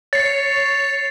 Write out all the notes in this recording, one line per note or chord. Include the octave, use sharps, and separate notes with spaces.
C#5 A6 C7